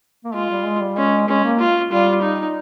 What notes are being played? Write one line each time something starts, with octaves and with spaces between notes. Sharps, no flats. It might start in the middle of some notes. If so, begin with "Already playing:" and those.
A#3
G#3 F4
G3
G#3
G3
G#3 C#4
G#3 C#4
A#3
F4
G3 F4
D#4